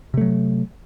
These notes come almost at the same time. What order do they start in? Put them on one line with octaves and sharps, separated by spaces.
C3 A3 F#3